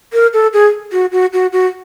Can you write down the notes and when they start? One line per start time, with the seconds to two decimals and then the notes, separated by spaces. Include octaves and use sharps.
0.13 A#4
0.33 A4
0.53 G#4
0.92 F#4
1.12 F#4
1.33 F#4
1.52 F#4